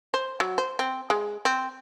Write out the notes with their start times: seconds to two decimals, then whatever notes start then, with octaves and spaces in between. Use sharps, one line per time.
0.14 C5
0.40 F#3
0.58 C5
0.79 C4
1.10 G#3
1.45 C4